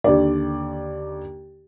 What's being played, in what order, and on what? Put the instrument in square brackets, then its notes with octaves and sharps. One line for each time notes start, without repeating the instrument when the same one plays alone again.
[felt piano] D#2 D3 D5